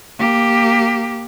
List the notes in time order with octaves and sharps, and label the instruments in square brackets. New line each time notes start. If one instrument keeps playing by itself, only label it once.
[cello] A#3 G4